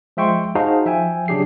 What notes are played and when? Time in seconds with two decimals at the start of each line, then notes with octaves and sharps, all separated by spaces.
0.17 F3 G#3 E5 G5 C6 C#6
0.55 D#4 F#4 G#4 C5 F5 A5
0.86 F3 E5 G5 G#5
1.28 C#3 F#3 D4 G4 G#4 C7